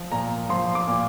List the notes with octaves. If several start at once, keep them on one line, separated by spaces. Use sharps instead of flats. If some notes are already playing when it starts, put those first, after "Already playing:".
Already playing: F3
A#2 A#5
F3 C6
D6
A#2